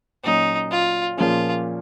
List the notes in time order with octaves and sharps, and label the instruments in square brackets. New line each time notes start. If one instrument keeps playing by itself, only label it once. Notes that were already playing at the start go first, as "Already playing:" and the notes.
[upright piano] A#2 F#3 C#4 [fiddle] D#4
[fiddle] F4
[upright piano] A#2 F3 A#3 C#4 G#4 [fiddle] F4